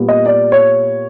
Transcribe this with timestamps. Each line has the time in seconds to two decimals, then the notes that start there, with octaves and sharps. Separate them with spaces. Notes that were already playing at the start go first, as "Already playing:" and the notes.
Already playing: A#2 G3 B3
0.08 D#5
0.26 D5
0.52 C#5